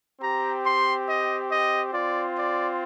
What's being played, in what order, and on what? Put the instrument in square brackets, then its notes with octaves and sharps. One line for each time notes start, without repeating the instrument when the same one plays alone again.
[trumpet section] C4 G4 A#5
C6
D#5
D#5
C4 F4 D5
D5